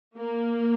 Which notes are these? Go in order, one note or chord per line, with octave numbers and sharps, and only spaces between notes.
A#3